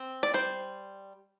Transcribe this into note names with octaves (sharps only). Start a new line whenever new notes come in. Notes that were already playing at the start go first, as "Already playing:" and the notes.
Already playing: C4
D5
G3 C5